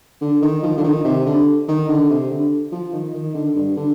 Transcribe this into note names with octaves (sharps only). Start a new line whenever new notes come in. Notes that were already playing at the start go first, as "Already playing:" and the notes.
D3
D#3
F3
D3
D#3
C3
D3
D#3
D3
C3
D3
F3
D#3
D#3
D3
G2
D3